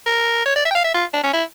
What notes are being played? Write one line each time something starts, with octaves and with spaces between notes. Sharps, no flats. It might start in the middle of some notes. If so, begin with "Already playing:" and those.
A#4
C#5
D5
E5
G5
F5
E5
F4
D4
C#4
E4